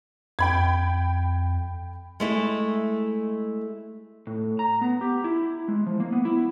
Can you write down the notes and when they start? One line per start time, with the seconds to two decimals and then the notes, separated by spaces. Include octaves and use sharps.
0.39 F2 G5 B5 G#6
2.20 G#3 A3 E4
4.27 A2
4.59 A#5
4.81 B3
5.01 G4
5.24 E4
5.68 G#3
5.86 F3
6.00 A#3
6.12 B3
6.25 E4